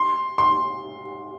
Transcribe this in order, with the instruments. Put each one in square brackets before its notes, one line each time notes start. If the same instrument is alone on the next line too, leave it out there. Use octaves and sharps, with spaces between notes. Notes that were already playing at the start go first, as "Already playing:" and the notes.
Already playing: [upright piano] C6
C6